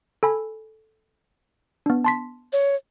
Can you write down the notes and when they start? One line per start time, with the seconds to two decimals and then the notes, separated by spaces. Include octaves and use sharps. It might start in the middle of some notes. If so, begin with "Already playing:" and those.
0.23 A4 G#5 B5
1.86 B3 D4
2.04 A5 C6 B6
2.53 C#5